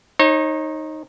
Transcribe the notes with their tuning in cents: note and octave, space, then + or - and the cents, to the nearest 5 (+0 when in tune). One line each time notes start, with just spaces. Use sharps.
D#4 +0 C#5 -40